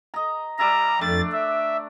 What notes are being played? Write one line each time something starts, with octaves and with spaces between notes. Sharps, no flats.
D#5 A#5
G3 D5 E5 A#5
F2 A3 D4 D5 A6
E5